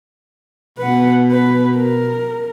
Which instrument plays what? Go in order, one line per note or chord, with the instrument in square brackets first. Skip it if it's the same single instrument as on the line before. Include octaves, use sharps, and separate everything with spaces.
[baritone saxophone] B2 [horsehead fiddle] B4 F#5
[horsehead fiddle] B4
A#4